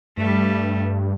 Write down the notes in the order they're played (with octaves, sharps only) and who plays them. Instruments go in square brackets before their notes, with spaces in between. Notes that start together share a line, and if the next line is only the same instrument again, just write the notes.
[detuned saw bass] G2 [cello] G3 A3